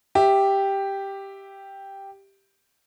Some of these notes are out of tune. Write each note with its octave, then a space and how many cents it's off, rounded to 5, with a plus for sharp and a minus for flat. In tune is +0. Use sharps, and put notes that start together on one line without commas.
G4 +0 E5 +0